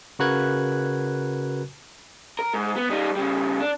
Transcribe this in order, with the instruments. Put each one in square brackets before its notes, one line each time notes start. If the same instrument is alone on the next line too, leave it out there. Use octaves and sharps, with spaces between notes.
[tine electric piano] C#3 F#4 A#4 B4 F#6 G#6
[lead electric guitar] A#4
G#2
B3
G3 D#4
C#3 G3
D4